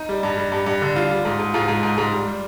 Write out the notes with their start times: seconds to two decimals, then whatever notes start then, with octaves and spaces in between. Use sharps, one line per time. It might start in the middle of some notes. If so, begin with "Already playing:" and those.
Already playing: D#4
0.09 G3
0.23 G2
0.38 G3
0.52 G2
0.66 G2
0.81 D3
0.96 G3 F4
1.10 G3
1.25 G#2
1.40 G#2
1.54 G#2 F4
1.68 G#2
1.83 G#2
1.98 G#2
2.12 G3
2.27 G3